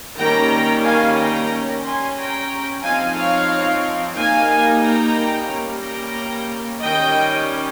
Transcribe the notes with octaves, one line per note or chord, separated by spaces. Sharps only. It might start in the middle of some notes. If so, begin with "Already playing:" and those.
D#3 G3 A#3 C#4 G5 A#5
F5 G#5
G5 A#5
G3 C#4
G#5 C6
G5 A#5
F3 C4 D#4 F5 G#5
C#5 F5
G3 A#3 D#4 F5 G#5
G5 A#5
G3 A#3 C#4
G5 A#5
D#3 G3 C#4 D#5 G5